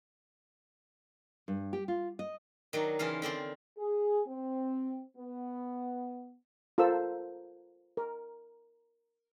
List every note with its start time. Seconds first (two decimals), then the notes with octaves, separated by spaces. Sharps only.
1.48 G2
1.73 G4
1.88 F4
2.19 D#5
2.73 D#3 F#3 D4
2.99 C#3 E3 F4 F5
3.22 D3 C4 D5 C6
3.78 G#4
4.27 C4
5.17 B3
6.78 F4 A4 A#4 C5 E6
7.97 A#4